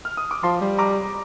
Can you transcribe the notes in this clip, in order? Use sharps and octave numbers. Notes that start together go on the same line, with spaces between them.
F6
D#6
D6
F3 A5 C6
G3
A#5 D6